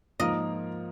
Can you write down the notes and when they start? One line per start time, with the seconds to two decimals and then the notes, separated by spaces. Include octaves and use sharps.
0.19 G#2 F3 A#3 F4 A#4 D#5